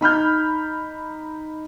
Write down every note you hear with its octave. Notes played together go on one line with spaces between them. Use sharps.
D#4 B5 F6 G6